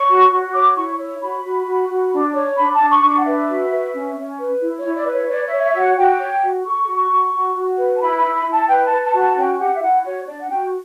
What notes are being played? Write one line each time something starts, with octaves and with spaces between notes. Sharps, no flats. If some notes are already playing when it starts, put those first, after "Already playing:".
Already playing: C#5 C#6
F#4
F#4
C#5 D6
E4 C#6
C#5
F#4 B5
F#4
F#4
F#4
D4
C#5
D4 B5
A5
D4
C#6
D4 C#6
F#5
B4 E5
F#4
B4
C#4
C#4
B4
E4
C#5
E4
D5
B4
C#5
C#5 D5
E5
C#5
E5
F#4 E5
F#5
F#4 G5
C#5
F#4
A4 C#6
F#4
F#4
F#4
F#4
B4
A5
E4 B5
B5
E4
B5
E4
A5
B4 G5
A5
B4
A5
F#4
A5
C#4 G5
G4 F#5
E5
E4 F#5
F#4 C#5
D4 D5
F#5
F#4 G5